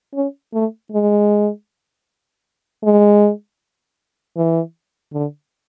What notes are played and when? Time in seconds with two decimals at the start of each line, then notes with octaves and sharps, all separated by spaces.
0.14 C#4
0.54 A3
0.92 G#3
2.84 G#3
4.37 E3
5.13 D3